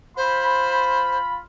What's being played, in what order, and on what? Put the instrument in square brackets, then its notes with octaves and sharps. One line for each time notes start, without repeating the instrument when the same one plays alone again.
[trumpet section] F4 B5 [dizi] C5